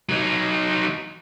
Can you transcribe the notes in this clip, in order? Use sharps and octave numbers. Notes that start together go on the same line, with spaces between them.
F#3 D#4